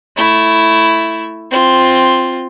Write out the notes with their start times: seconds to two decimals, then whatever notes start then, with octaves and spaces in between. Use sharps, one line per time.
0.17 A3 E4
1.51 C4 F4